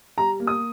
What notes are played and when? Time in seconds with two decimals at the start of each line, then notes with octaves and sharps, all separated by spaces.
0.18 G3 A#5
0.40 A#3
0.47 D#6